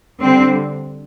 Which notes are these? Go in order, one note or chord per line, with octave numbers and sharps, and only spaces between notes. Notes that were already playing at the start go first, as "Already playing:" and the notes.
D3 G3 C4